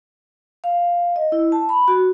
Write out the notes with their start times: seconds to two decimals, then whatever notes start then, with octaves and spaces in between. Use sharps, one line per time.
0.64 F5
1.16 D#5
1.32 E4
1.52 A5
1.69 B5
1.88 F#4